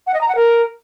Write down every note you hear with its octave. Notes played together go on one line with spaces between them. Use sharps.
F#5
D#5
A#5
F#5
A#4